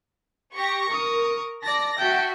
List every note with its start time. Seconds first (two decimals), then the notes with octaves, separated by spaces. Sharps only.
0.55 G4 C#6 A#6
0.90 A#4 C#6 D#6
1.63 D5 A5 A#6
1.99 F#4 E5 G5 A5